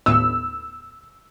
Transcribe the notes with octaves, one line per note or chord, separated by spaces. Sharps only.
D#2 A2 B3 E6